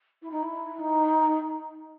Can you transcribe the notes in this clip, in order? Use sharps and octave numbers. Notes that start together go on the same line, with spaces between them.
E4
D#4
E4
D#4